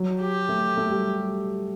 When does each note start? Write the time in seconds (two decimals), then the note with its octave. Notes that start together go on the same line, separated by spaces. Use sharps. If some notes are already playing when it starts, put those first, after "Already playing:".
Already playing: F#3
0.20 G4
0.49 A3
0.77 A3
0.91 G3